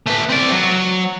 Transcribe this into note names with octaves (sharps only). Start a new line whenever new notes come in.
A3 B4
C4 D5
F#3